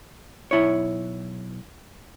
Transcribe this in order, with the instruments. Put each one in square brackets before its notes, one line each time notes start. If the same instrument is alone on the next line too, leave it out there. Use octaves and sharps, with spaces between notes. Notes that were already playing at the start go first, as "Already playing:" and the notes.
[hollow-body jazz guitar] B1 E4 C#5